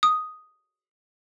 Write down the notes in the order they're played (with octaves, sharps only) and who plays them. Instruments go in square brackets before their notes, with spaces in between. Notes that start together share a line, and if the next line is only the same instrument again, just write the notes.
[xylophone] D#6